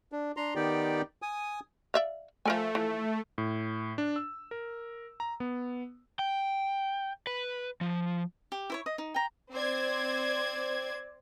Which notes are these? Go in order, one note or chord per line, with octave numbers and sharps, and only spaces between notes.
D4
D4 A#5 C6
D#3 B3 D#4 G4 D5 G5
G#5 D#6
D5 E5 F5
F3 A3 A#4 G#5
E3 F3
A2
D4
E6
A#4
A#5
B3
G5
B4
F3
G4
E4 C5 C#5
D#5
D#4
G5 A#5
C4 C5 D5 G#6